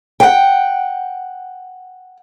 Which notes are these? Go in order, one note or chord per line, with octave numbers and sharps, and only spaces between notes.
F#5 G5